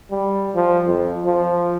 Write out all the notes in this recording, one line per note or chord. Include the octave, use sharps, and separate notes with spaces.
G3
F3
F2
F3